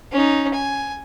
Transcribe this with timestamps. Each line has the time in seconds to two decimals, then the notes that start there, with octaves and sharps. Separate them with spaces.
0.12 C#4 D#4
0.54 G#5